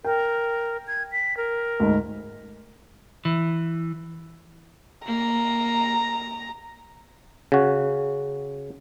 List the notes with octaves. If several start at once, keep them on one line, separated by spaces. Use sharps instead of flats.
A#4 G5
G#6
B6
A#4
D2 G#2 D#4
E3
A#3 A#5
C#3 F#4